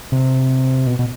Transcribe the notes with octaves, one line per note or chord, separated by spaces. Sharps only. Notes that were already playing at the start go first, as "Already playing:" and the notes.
C3
B2
B2